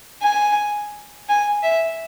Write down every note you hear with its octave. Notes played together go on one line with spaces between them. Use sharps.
G#5
G#5
E5